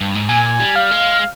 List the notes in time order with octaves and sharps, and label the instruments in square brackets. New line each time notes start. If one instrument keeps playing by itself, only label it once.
[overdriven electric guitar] G2
G#2
[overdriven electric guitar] A#2 [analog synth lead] G#5
[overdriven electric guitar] G3
[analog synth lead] F5
[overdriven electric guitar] G#3